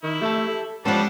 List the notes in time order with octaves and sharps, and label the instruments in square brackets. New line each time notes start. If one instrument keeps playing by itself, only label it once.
[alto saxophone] D#3 [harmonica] E4
[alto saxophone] A3 [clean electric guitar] G4 E5 A5
[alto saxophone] A4
[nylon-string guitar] F3 B3 [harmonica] G3 D4 A4 [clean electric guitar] G#3 F#5 [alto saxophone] C#4